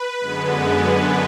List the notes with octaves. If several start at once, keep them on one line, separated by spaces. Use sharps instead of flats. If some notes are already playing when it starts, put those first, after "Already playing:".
Already playing: B4
F#2 D3 G#3 B3